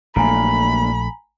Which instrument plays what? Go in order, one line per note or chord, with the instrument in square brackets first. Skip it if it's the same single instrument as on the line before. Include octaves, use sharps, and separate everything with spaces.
[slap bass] A#1 A3 [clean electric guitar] F#2 A#2 [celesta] G#5 A#5 [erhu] B5